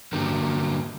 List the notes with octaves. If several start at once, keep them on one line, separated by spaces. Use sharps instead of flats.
G2 D3 F#3 G3 A#3